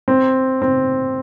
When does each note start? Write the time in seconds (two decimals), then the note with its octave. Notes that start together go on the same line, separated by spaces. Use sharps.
0.08 C4
0.62 C4